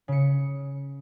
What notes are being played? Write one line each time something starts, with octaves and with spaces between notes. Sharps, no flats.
C#3 C#7